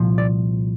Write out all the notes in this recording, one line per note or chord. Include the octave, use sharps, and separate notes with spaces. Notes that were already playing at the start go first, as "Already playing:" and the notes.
Already playing: C2 A#2 F3
D5